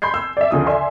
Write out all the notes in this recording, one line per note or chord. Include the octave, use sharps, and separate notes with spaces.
B5 C6 G6 G#6 C7
E6
D5 E5
D2 C#3 F3 D#6
D5 E5 G#5 C6